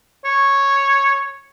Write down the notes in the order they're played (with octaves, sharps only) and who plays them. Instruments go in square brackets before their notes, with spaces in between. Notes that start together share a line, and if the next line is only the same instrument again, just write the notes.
[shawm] C#5